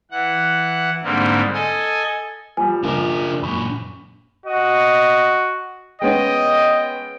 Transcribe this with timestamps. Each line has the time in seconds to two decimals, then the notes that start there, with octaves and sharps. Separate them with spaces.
0.11 E3 F#5
1.03 G#2 D3 G3 G#3 A#3 C4
1.53 A4 D#5 G#5
2.57 F3 G3 G#5
2.84 F#1 F3 D4 A#4 D6
3.43 F#2 A#2 B5 C#6
4.46 F#4 D#5
6.02 G#3 B3 C#4 D#5 G5